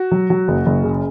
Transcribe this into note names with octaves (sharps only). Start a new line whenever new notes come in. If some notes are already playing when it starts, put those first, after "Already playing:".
Already playing: F#4
F#3
F#3
F#1
F#1
C#3